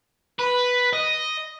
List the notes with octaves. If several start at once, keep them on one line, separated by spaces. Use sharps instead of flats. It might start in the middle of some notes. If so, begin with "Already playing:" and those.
B4
D#5